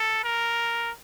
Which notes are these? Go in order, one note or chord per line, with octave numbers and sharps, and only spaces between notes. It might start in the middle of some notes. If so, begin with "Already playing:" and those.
Already playing: A4
A#4